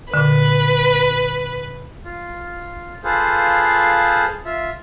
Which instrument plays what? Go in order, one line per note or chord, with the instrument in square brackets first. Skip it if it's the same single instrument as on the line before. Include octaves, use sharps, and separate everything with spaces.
[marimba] A#2 D3 [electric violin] B4
[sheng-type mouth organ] F4
F4 G#4 A4 B4 C5 F5
F4 E5